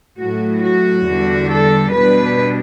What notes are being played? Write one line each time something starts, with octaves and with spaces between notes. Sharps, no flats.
A2 F#3 A3 F#4
F#4
E2 D3 G3 D4
A4
B2 G3 D4 B4